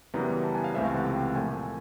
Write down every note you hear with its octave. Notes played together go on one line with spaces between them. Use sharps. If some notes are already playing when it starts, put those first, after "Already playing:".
F#2 C#3 E3 G3 B3 A#5
A5
G#5
F5
C#2 C3 E3 A3 C4 E5
F5
F#5
G5
A#2 F3 A3 G#5